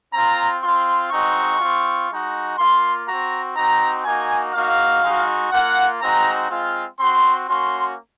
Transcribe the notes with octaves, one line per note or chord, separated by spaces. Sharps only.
C4 F4 A#5
C4 F4 C6
G#3 C4 D#4 F#4 C#6
C4 F4
G#3 D#4 F#4
A#3 F4 C6
C4 F#4 A#5
C4 D#4 F#4 A#5
A#3 D#4 F#4 G#5
A#3 D#4 F#4 F5
G#3 D#4 F#4
A#3 F4 F#5
G#3 C4 D#4 F#4 A#5
G#3 C4 F4
C4 F#4 C6
A#3 C#4 F#4 C6